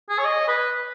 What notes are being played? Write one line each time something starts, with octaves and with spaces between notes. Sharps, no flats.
G#4
C#5
D#5
B4